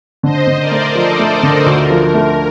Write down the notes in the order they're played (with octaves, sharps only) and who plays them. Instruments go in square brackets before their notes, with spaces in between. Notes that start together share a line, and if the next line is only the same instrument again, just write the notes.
[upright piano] D3 [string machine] C5 D#5
[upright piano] D3
[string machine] A#4 D5
[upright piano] A3
[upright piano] F3 [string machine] A4 C5
[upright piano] A3
D3
[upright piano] D2 [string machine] A#4
[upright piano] F3
A3